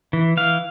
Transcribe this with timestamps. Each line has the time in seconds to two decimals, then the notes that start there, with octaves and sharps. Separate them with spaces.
0.13 E3
0.37 E3 F5